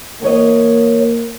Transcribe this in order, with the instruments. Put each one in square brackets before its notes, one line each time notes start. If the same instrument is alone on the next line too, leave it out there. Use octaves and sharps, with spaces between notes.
[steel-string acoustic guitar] E2 C#5 D#5 [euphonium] A#3